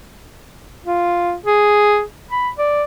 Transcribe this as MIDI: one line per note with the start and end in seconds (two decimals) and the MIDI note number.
0.86 1.35 65
1.46 2.02 68
2.31 2.49 83
2.58 2.83 74